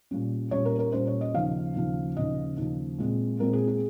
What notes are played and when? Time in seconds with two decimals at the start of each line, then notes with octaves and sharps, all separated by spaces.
0.11 A#2 G3 C#4
0.51 A#2 G3 C#4 C#5
0.65 A#4
0.79 A#4
0.93 A#2 G3 C#4 C5
1.07 C#5
1.21 D#5
1.34 D#2 C#3 F3 F5
1.75 D#2 C#3 F3
2.16 D#2 C#3 F3 D#5
2.57 D#2 C#3 F3
2.98 A#2 G#3 C4
3.39 A#2 G#3 C4 A#4
3.53 G#4
3.67 G#4